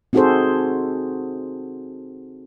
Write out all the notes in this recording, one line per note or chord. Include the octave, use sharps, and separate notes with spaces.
C4 D#4 F#4 G#4 A4 C5